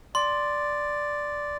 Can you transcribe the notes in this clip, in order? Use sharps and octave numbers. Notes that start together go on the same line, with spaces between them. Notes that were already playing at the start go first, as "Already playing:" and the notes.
D5 C6